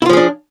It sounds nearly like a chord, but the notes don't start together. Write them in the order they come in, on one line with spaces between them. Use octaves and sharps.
E4 F4 F3 G#4 D4